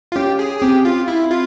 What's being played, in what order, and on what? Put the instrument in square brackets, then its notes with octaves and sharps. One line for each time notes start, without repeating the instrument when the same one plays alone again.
[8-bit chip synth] F4
[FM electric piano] C#4 [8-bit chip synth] G4
[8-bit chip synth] G#4
G#4
[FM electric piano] C4 [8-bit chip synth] G4
[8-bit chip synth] F4
E4
F4